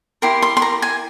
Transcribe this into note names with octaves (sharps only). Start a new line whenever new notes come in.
E4 G4 A#4 C6
C6
C6
A#5
G#5